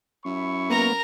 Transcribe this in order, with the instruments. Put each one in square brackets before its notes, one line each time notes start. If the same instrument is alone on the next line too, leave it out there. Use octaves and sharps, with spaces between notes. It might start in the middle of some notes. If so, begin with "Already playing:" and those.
[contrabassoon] F#2 [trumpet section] E4 B5 C#6
[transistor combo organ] A#3 B3 [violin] A#4 A#5